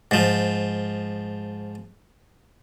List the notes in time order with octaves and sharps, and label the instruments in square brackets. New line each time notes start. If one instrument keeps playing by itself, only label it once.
[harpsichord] G#2 F3